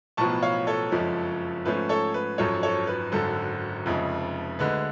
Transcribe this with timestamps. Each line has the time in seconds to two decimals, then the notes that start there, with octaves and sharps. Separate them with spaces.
0.17 B1 A2 F3 B3 A5 C#6
0.42 C#5 F5
0.67 A4 C#5
0.91 F#1 F2 F3 G#3
1.65 G#2 F3 A3 C#4 B4
1.89 A4 C#5
2.14 B4
2.38 G#1 F#2 F3 A4 C#5
2.63 A4 C#5
2.87 B4
3.12 G#1 F#2 D3 A4
3.86 F1 F2 C#3 G#3
4.59 D2 D3 G#3 B4